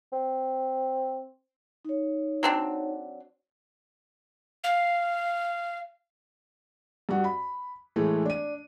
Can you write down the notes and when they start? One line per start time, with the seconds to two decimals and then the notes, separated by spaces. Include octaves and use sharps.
0.12 C4
1.85 D#4 C#5
2.43 F#3 C4 D4
4.64 F5
7.09 G2 F#4
7.24 B5
7.96 A2 E3 G#3 A3
8.25 D4 D#7